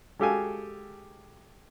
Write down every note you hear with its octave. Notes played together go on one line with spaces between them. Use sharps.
G#3 F#4 G4 A4 F5 G#5